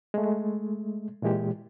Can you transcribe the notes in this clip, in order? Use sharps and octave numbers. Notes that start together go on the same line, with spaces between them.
G#3 A3
A#2 E3 G#3 G4